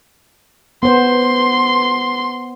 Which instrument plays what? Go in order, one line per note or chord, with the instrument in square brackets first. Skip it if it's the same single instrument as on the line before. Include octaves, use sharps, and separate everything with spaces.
[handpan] B3 C5 [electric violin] C6